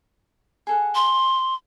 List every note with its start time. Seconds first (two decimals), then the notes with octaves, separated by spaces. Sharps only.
0.67 G#4 A4 F#5
0.95 C6